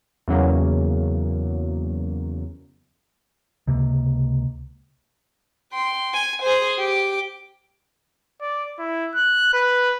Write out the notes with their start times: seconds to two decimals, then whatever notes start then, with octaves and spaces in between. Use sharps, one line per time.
0.28 E2 C#3 F#3 A#3
3.67 C#2 C3 A#3
5.73 G5 C6
6.13 G#5
6.43 G#4 C5
6.79 G4 D6
8.42 D5
8.79 E4
9.15 F#6
9.53 B4